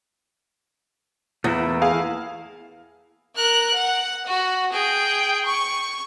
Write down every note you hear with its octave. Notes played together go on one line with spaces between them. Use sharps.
E2 A3 A#3 E4
G#4 F5
A#4 F#6
F#5
F#4
G#4 G5
C#6